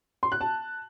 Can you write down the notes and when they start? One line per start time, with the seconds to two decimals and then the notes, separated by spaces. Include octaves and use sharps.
0.23 C6
0.32 F#6
0.41 A5